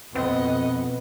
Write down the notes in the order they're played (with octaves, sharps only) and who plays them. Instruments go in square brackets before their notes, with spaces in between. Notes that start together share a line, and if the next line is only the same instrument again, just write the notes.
[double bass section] F2 B2 [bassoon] B3 [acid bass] C4 [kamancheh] D#5 F#5